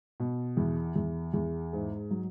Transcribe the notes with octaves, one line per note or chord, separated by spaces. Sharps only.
B2
E2
E2
E2
G#2
F#3